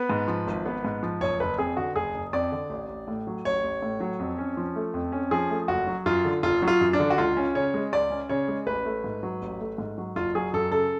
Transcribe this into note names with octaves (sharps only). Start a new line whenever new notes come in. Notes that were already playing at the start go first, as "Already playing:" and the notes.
Already playing: B3 B4
G#2
F3
G#1
B3
G#2
F3
F#1 C#5
F#1 B4
F2 G#4
D3 F#4
F#1 G#4
F#1
F2 D5
D3
A1
A1
A2
F#3
A1 C#5
A1
A2
F#3
F2
C#4
F3
A3
F2
C#4
F3 G#4
A3
F#1 F#4
F#3
F#2 F4
D3
F#1 F4
F#3
F4
F#2
D4
D3
F#4
C#2 F4
C#4
C#3 C#5
G#3
C#2 D5
C#4
C#3 C#5
G#3
A1 B4
A3
G#2
F#3
A1
A3
G#2
F#3
F#1 F4
F#3 G#4
F#2 A4
C#3 A4